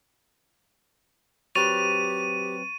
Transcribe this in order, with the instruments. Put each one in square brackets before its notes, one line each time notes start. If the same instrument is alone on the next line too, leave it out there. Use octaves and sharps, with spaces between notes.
[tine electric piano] F#3 C4 B4 [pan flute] G4 [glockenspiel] C#6 A6 F7 [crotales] D#7